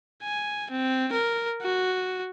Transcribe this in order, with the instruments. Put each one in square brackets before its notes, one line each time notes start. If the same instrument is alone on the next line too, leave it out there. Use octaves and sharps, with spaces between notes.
[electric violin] G#5
C4
A#4
F#4